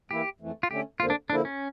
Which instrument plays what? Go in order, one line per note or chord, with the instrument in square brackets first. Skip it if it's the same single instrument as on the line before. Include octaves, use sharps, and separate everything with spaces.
[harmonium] E3 A#3 E4 [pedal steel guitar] G4
[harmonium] F2 E3 A3
[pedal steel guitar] F4
[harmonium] D3 A3 C#4 [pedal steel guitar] G4
[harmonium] F2 D3 F3 A#3 [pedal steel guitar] F4
[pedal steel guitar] D4
[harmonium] D3 F3 A#3 E4 [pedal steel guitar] D4
[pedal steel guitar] C#4